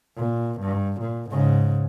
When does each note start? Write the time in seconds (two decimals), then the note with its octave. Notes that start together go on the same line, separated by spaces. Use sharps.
0.17 A#2
0.61 G2
1.01 A#2
1.30 G#2 C#3